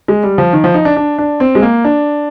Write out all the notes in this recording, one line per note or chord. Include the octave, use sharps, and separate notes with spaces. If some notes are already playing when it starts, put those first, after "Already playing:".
G#3
G3
F3
D#3
F3
D#4
D4
D4
D4
C4
G#3
A#3
D4